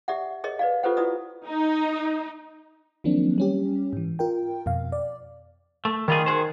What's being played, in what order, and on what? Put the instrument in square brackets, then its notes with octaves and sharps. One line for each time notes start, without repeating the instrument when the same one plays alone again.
[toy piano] G4 D5 E5 F#5
G#4 A#4 C#5 D#5
B4 D5 F5
F4 G4 A4 B4 C5 F#5
E4 F#4 B4 D5 D#6
[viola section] D#4
[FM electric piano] D#3 F3 F#3 A#3 C4 D4
G3 C#4 G4
G#2 E3
F4 A#4 G5
F2 B2 F5
D5
[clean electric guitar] A3
[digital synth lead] D#3 [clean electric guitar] G3 F4 G#4
[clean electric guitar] F#4 G#4 C5